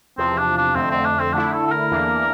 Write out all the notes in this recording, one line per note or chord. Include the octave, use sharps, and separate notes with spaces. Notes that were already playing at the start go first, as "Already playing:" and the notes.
E2 C3 F3 C4
D4
D4
F2 D3 A3 C4
C4
D4
C4
D3 A3 D4 E4
A4
A4
A#4
E2 E3 A#3 D4